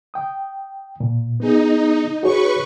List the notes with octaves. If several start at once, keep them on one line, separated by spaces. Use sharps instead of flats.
G5 D#6
A#2
B3 D#4 G#4
F#4 G#4 B4 C#5 C#6